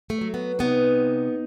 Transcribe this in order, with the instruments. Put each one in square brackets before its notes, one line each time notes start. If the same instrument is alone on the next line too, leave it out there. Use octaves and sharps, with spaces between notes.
[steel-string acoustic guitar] A3
F#3
B3
C3 B3 D#4